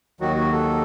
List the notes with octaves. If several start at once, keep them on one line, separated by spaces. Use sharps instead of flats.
D#2 D#3 F#3 F#4
F#4
A4